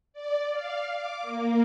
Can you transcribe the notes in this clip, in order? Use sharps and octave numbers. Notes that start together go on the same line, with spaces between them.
D5
F5
D6
A#3